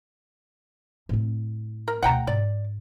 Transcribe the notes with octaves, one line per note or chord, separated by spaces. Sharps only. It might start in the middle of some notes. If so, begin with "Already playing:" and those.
A2 C4
A#4
D2 B2 F#5 G5 A#5
G#2 D5